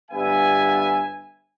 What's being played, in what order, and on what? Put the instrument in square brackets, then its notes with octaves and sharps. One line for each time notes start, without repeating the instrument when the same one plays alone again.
[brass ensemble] G1 G2 B3 E5 G#5